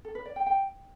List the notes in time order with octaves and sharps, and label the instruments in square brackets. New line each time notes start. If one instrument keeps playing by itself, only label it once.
[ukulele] A4
B4
D5
G5
G5